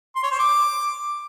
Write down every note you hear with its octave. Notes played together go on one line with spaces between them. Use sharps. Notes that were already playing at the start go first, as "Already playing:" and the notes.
C6
C#5
C5
D6